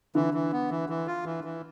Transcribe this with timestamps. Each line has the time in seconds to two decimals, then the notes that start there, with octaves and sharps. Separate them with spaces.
0.15 D3 E3
0.34 E3
0.52 B3
0.70 E3
0.89 E3
1.07 F4
1.25 E3
1.44 E3